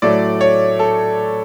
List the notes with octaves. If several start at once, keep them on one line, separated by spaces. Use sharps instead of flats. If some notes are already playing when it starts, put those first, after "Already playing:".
A2 F#3 A3 D5
C#5
A4